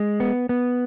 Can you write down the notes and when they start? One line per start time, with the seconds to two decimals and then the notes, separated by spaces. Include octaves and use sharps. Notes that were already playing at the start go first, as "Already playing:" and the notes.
Already playing: G#3
0.20 B3
0.49 B3